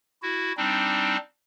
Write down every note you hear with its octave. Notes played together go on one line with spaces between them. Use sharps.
E4 F#4
G3 C4 D4 D#4